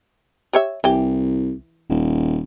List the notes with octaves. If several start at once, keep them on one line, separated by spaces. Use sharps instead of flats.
G4 C#5 E5
C2 E3 G4
D#1